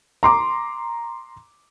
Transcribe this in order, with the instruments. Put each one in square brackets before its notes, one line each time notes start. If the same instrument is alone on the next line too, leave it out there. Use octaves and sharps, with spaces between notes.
[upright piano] A#5 C6 D6